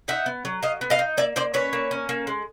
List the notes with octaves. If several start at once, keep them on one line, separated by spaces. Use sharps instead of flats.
D#4 E5 F#5
B3
F#3
F#3 D#5 F5
B3
D#5 F5
D#4
A#3 D5 E5
A#3 C5 D5
C#4 B4 C#5
A#3
C#4
A#3
G#3